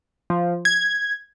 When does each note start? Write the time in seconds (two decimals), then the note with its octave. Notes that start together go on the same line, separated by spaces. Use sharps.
0.30 F3
0.65 G#6